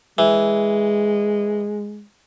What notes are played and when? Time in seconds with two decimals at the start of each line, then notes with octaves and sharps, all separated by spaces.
0.18 E3 G#3